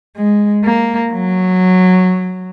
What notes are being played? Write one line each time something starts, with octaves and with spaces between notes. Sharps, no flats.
G#3
A#3
F#3